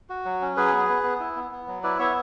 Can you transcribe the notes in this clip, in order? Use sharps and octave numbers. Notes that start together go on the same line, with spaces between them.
F#4
F#3
C#4
F#3 G#4 B4
B3
B3
B3
E4
B3
B3
F#3
E4 B4 D5
B3 C#5 E5